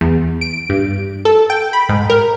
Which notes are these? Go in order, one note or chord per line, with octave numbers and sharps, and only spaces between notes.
E2
D7
G2
A4
G5
B5
G#2
A#4